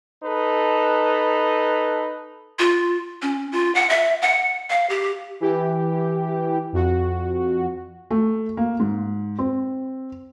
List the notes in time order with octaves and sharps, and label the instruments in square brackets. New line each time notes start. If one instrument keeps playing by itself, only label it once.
[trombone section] D#4 A4 B4
[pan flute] F4
C#4
F4
F#5
E5
F#5
F5
G4
[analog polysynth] E3 G4
F2 F#4
[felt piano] A3
A#3
G#2
C4